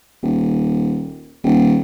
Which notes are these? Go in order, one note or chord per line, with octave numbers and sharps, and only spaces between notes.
D#1
D#1